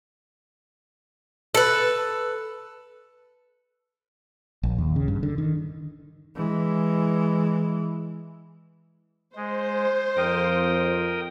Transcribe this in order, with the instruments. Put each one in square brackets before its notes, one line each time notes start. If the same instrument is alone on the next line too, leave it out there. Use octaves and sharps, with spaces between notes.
[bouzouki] A4 B4
[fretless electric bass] A#1
D#2
C#3
G2
D3
D#3
[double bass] E3 G#3
[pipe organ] G#3 [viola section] C5
[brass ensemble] F2 [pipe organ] A#4 G5 D#6